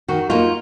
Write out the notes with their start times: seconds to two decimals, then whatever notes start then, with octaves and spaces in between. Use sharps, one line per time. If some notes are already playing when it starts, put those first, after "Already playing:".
0.08 D#3 F#4
0.30 A#3 D#4 F4 F#4